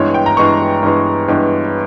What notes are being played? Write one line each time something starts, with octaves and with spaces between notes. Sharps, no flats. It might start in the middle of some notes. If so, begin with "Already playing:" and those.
Already playing: G2 E3 G#3 B3 C#5
G5
A#5
G2 E3 G#3 B3 C#6
G2 E3 G#3 B3
G2 E3 G#3 B3